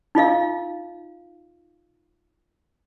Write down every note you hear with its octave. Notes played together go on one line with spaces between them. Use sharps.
D#4 F4 D#5 F5